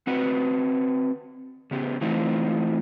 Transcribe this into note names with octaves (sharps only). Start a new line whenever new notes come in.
C4 F#4 B4 F#5
C#3 B3 G4
E3 A3 C4 D#4 F4